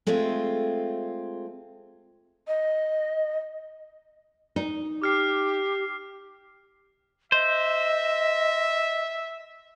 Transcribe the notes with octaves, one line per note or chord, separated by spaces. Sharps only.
G#3 A3 C4 F4 G#4 E5
D#5
D#4
G4 D6 F6 C7
C5 D#5 E5